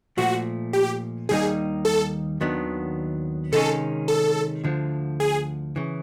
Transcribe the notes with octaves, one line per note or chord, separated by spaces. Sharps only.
A#2 F3 A3 F#4
G4
D#2 D#3 G3 A#3 D#4 G#4
A4
D#2 D#3 F#3 B3 D4
C3 D#3 G#3 C#4 A4
A4
D2 D3 F3
G#4
C#3 E3